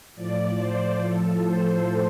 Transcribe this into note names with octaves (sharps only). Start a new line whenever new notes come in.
A2 F3 D5
C5
A2 F3 A4
C5